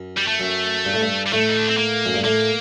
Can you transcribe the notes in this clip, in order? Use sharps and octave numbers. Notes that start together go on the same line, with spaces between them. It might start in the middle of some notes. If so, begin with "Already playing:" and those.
Already playing: F#2
G3
A3
F#2
G2
A2
G2
G3
A2 A3
D#4
D4
C4
A#3
F#2
G2
A2 A#3